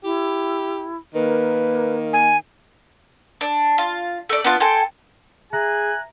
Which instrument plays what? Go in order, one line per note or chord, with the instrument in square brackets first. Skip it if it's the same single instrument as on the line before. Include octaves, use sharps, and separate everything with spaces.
[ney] E4 [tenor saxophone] G4
[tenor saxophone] D#3 [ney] A#3 [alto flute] B4
[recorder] G#5
[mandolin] D4
F4
A3 D5
B3 D4 F4
A4 G5 G#5 C6
[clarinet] G#4 [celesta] E5 A#5 A#6 [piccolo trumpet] G#5 [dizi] F#6